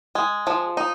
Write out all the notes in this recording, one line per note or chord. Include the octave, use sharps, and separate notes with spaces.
G#3
F3
D#4